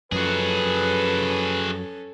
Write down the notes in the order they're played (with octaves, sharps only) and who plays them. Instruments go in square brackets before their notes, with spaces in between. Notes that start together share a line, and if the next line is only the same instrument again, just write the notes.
[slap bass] F#2 F3 [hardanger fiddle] C#4 A4 [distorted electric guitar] F#4 G#4 [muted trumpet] B4